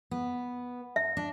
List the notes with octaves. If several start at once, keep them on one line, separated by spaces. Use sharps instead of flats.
B3
E5
D4